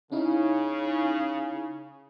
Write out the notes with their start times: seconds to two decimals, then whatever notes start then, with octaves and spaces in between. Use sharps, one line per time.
0.12 C#3 C#4 D#4 E4